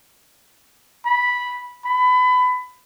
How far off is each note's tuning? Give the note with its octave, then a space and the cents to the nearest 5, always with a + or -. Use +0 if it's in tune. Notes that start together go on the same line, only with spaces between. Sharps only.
B5 -5
B5 +25